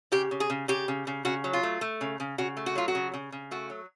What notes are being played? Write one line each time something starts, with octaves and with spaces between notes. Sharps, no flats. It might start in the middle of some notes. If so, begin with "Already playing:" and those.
C#3 G4
C#3
G#4
C#3
C#3 G4
C#3
C#3
C#3 F#4
F#3
F4
A3
A3
C#3
C#3
C#3 F#4
A3
F#4
F#3 F4
F#4
C#3
C#3
C#3
A3 F#4
F#3